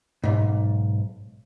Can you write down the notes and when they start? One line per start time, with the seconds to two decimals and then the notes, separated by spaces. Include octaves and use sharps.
0.24 B1 G#2